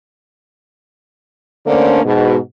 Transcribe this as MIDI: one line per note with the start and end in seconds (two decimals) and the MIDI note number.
1.66 2.03 50
1.66 2.03 57
1.66 2.03 58
1.66 2.03 61
1.66 2.03 62
1.66 2.03 72
2.04 2.36 44
2.04 2.36 47